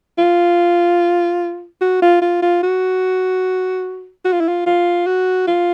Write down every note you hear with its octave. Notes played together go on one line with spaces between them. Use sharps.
F4
F#4
F4
F4
F4
F#4
F#4
F4
E4
F4
F4
F#4
F4